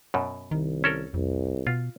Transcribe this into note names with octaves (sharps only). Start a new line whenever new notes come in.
F#2 B2
C2 D#3
C#4 A4 A#4
C2 F2
B2 F4